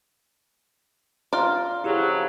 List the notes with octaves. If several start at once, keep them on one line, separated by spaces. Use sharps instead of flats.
F4 D5 A#5
F2 C#3 F#3 E4 G4 G#4